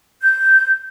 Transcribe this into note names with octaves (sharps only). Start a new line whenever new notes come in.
G6